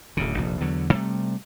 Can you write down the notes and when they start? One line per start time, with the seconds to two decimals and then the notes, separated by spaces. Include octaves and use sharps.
0.17 D1 D2 C#3
0.38 F1 A#1
0.61 E2 D3 F#3
0.92 C3 G3 A3